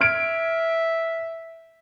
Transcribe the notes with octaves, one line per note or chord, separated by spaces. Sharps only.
E5 F6 G#6 D7